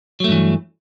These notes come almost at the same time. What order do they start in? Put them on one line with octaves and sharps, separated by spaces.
F#3 A3 G2 E3